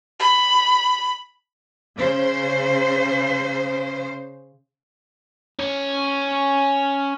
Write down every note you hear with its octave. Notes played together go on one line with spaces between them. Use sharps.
B5
C#3 C5
C#4 C#5